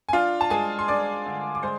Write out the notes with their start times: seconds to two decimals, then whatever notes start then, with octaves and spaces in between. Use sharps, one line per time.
0.09 G#5
0.13 D4 F4 F5
0.41 A5
0.50 G#3 G#4 G#5
0.79 C6
0.88 D4 D5 D6
1.26 D3
1.55 D6
1.63 G#3 C5 C6